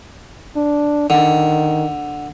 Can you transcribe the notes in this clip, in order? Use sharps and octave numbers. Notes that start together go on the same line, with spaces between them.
D4
D3 D#3